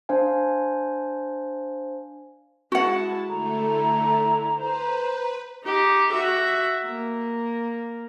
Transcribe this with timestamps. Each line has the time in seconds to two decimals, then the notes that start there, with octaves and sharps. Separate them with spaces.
0.09 D4 C5 F5 G#5
2.72 G#3 E4 F#4 F#5 A5
3.29 D3 A3 E4 A#5
4.58 B4 C5
5.64 D#4 G4
6.13 F#4 E5
6.86 A#3